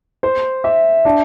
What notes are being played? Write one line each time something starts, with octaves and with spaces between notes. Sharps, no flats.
C5
E5
D4